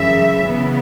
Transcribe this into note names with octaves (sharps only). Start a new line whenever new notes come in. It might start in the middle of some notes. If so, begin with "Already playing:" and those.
Already playing: F#2 C#3 E3 E5
C#3 E3 B3